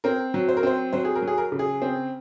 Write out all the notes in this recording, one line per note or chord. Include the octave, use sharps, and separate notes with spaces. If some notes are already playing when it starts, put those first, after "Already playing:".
C4 A#4
F#3
C5
A#4
C4 C5
F#3 C5
G#4
A#4
F#3
G#4
A#4
C#3
G#4
C4